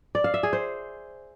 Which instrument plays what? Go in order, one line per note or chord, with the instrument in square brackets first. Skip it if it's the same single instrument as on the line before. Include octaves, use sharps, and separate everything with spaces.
[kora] D5
F5
E5
G#4
C5